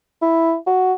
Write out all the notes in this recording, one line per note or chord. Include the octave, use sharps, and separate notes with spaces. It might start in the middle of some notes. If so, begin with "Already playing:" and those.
E4
F#4